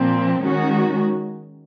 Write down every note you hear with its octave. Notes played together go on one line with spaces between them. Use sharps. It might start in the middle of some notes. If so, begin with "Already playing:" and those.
Already playing: A#2 F3 C4
D#3 G#3 C#4 F#4